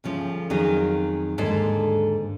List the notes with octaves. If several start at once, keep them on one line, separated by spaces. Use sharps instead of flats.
D2 C#3 F3 C#5
F2 D#3 F#3 G#4
D#2 G#2 D3 A4 C5